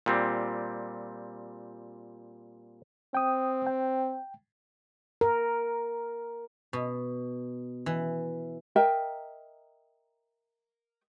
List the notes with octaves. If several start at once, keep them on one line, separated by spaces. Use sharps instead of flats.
A#2 G3 C4
C4 G5 D#6
G5
A#4
B2
E3
A#4 D#5 E5 G5